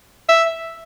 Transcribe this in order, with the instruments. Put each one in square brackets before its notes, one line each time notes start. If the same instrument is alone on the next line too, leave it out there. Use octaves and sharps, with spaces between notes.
[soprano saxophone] E5